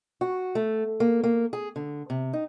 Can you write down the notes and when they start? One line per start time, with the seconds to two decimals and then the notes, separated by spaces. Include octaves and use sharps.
0.21 F#4
0.55 A3
1.00 A#3
1.23 A#3
1.53 G#4
1.76 D3
2.10 C3
2.33 D#4